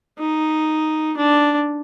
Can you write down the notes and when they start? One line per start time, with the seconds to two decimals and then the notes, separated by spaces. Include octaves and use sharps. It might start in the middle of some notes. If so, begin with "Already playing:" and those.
0.18 D#4
1.17 D4